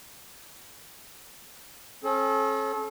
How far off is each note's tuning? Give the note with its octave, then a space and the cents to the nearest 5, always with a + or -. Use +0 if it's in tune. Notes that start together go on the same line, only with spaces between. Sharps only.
C#4 -40 A4 -35